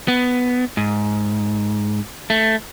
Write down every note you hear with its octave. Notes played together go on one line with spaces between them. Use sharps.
B3
G#2
A3